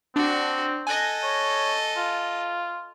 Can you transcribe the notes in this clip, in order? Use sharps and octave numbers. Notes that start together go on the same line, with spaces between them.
C4 D4 F#4
A4 D#5 G#5 F#6 A#6
C#5
F4